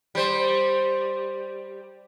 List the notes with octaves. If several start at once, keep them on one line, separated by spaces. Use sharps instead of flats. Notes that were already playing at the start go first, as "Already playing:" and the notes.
G3 C5